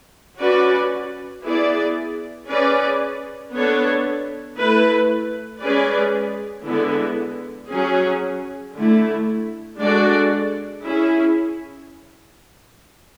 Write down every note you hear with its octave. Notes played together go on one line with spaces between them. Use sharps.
C#4 F#4 B4 D5
B3 E4 G#4 D5
C#4 G#4 B4 D5
B3 D4 A4 C#5
A3 E4 B4
G#3 C#4 G#4 B4 D5
D3 G#3 B3 E4
F#3 C#4 G#4
D3 A3 E4
G#3 D4 F#4 A4 D5
C#4 E4 G#4